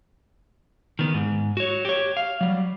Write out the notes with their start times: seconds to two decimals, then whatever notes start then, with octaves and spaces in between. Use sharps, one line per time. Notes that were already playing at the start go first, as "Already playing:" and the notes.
0.99 D#3 B3
1.14 G#2
1.57 F#4 C#5
1.85 G4 C#5
2.17 F5
2.41 F#3 G3